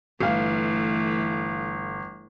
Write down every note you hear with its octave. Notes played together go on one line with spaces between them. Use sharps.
G1 E3 A3 F5